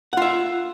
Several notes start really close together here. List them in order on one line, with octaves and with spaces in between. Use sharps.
F#5 F4 E5